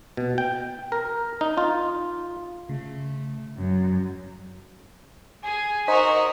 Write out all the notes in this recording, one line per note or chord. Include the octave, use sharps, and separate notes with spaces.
B2
G5
A#4
D#4
F4
C#3 A3
F#2
G#4 G#5
D#4 F#4 A#4 C5 D#5 B6